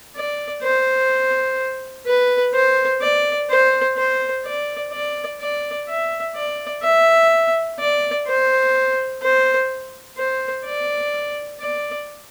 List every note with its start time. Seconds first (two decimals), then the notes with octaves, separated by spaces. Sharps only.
0.16 D5
0.62 C5
2.06 B4
2.54 C5
3.01 D5
3.50 C5
3.97 C5
4.45 D5
4.92 D5
5.40 D5
5.89 E5
6.35 D5
6.83 E5
7.80 D5
8.27 C5
9.22 C5
10.17 C5
10.65 D5
11.60 D5